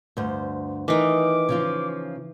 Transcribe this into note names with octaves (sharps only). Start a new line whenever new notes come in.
D2 G2 C5
D#3 E3 D#4 D6
C#3 F3 F4